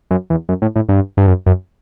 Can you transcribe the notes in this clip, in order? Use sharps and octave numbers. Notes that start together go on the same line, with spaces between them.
F#2
E2
F#2
A2
A2
G2
G2
F#2
F#2